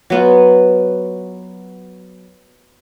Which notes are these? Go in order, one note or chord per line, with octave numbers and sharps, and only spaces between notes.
F#3 B3 F4